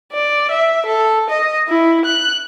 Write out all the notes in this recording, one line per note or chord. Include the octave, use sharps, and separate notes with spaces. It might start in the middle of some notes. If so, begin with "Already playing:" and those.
D5
E5
A4
D#5
E4
F#6